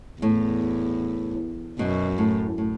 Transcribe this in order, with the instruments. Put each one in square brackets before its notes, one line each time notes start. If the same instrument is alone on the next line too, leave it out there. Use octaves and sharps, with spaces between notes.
[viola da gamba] E2 [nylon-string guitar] A2
[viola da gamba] F#2 [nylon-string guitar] B2
[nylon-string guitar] A2
A2